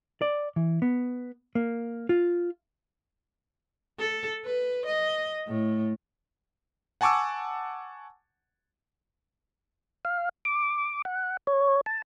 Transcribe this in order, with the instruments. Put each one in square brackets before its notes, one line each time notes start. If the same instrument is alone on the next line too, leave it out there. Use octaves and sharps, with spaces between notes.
[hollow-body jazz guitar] D5
E3
B3
A#3
F4
[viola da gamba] A4
B4
D#5
A2
[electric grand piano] F#5 G#5 A5 C#6 D6 E6
[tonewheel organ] F5
D6
F#5
C#5
A5